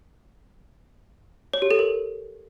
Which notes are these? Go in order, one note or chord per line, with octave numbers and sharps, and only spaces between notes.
C#5
G4
A4
A#4